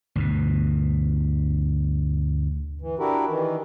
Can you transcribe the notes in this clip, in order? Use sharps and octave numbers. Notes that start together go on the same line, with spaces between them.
D2 G2 B2
E3
D4 E4 F#4 G4 A#4
D#3 E3